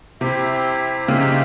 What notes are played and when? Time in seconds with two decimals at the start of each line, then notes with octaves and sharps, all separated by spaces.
0.20 C3 C4 E4 G4 C5 E5
1.08 C#3 A#3 D#4 G4 C5 E5